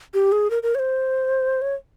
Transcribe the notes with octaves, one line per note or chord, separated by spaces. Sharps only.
G4
G#4
A#4
A#4
C#5
C5
C#5